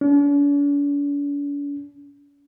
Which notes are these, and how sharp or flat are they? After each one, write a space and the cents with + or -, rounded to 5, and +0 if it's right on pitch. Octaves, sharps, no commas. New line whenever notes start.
D4 -45